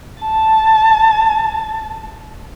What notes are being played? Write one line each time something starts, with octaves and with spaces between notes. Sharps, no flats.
A5